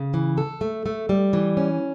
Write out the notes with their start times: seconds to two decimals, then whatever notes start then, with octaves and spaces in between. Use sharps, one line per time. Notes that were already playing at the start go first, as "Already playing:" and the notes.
Already playing: C#3
0.14 E3
0.38 A4
0.61 A3
0.86 A3
1.09 G3
1.33 E3
1.57 C#4